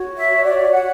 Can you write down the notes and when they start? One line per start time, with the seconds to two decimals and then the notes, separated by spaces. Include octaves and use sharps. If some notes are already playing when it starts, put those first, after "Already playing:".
Already playing: F#4 C#5
0.17 E5
0.44 D5
0.72 F#5